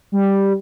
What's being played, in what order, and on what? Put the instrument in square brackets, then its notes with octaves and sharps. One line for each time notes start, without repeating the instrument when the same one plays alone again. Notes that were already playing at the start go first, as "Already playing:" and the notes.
[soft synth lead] G3